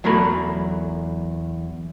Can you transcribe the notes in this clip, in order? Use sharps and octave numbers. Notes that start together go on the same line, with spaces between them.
E2 F#3 A3 A#4 B5